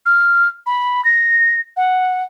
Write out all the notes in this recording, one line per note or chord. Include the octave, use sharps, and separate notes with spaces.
F6
B5
A#6
F#5